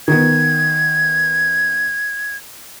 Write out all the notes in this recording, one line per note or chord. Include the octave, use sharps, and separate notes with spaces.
D#3 B3 G#6